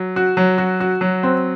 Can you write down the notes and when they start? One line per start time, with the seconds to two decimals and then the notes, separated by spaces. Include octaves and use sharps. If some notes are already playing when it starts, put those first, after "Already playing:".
Already playing: F#3
0.16 F#4
0.37 F#3
0.58 F#4
0.80 F#4
1.01 F#3
1.23 C4